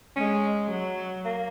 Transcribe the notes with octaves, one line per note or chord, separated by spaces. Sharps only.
G#3 C#4
F#3
A#3